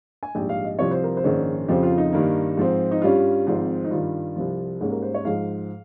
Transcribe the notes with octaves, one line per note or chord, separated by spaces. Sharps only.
G#5
A#1 G#2 G3 G5
F5
D#5
C2 C3 F3 C4 C#5
C5
A#4
C5
A#1 G#2 D#3 G#3 C#4
F2 C#3 F3 C4 G4
F4
D#4
G2 D#3 A#3
G#2 F3 C4
D#4
G2 G3 C#4 F4
G#1 G#2 F3 C4
D#4
G2 D#3 G3 F4
C2 C3 F3
G#2 G3 A#3 C#4 G#4
A#4
C5
C#5
G#2 F3 G#3 F5